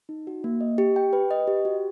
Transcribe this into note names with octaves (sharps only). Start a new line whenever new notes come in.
D#4
F#4
A#3
D#5
G4
G5
B4
D#5
G4
F#4